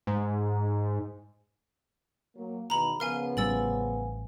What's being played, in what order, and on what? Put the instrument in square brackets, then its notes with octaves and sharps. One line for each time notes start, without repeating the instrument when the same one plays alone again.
[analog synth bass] G#2
[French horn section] F#3 A#3
[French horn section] E2 B2 D#3 [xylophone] A#5 B5
[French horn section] C#3 F3 B3 [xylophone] A#4 F5 G#5
[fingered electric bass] A1 G3 C#4 [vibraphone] G#5 [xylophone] E6 A6 F#7